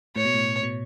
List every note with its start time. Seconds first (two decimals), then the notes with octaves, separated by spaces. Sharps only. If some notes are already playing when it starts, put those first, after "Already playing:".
0.16 A2 C#5
0.25 B2
0.34 A2
0.63 B2